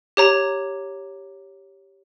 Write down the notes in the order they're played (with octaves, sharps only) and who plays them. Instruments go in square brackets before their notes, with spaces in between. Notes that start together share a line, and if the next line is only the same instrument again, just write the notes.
[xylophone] G4 C#5 A#5